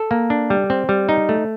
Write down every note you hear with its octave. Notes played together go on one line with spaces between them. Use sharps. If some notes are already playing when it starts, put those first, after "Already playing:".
Already playing: A4
A#3
D4
G3
C4
G3
D#4
A3